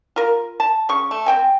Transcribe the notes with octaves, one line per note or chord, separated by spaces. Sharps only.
F4 A#4
A5
C#3 C#6
A3
C4 G5 G#5